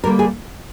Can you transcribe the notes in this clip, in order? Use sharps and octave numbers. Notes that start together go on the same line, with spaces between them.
D3 G3 A#3 A#4
G#4